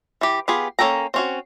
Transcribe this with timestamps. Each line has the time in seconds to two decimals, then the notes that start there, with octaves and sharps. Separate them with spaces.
0.21 E3 G4
0.48 B3 F4 G4 G#4
0.79 A#3 C#4 A4 G5 A#5
1.14 C4 C#4 F#4